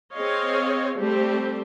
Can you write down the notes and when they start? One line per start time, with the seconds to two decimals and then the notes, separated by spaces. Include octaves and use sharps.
0.14 C4 G#4 C#5 D#5 F5
0.98 G3 A3 C4 G4 C5